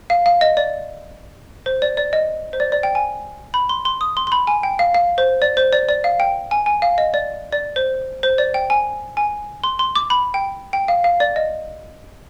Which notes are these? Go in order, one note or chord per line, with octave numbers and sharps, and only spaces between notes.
F5
F5
D#5
D5
C5
D5
D5
D#5
C5
D5
D5
G5
G#5
B5
C6
C6
D#6
C6
C6
B5
G#5
G5
F5
F5
C5
D5
C5
D5
D5
F5
G5
G#5
G#5
F5
D#5
D5
D5
C5
C5
D5
G5
G#5
G#5
C6
C6
D6
B5
G5
G5
F5
F5
D5
D#5